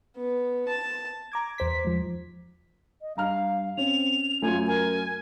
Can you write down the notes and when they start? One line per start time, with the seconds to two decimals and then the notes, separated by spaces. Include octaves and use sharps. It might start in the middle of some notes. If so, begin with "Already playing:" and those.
0.16 B3
0.69 A5
1.32 A#5 D6 G#6
1.58 E2 C5 B6
1.85 G#2 F3
3.02 D#5
3.17 G2 F5 A#5 F6
3.77 C4 C#4 F7
4.42 F#2 A3 F4 G#5
4.67 A#4 G#5